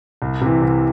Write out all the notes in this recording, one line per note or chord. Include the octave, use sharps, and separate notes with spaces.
C2
C3 E3
C2